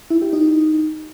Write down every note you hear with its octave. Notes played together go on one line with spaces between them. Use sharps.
E4
G4
D#4